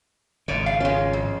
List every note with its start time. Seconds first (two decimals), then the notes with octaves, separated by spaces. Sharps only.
0.48 G#1 C#3 G#3 C#5 D5
0.66 F5
0.80 G#3 C#4 F4
1.13 F2